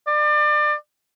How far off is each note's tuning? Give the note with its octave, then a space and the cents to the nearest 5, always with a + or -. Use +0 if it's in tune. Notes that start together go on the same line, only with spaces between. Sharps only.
D5 +30